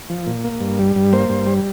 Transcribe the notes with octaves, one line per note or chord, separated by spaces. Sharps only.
F3
A#2
A#3
G2
G3
G2
A#3 C5
G2
G3